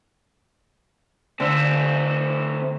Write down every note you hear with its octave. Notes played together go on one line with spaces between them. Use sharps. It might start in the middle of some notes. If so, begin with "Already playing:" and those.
D3 A3 C4 E6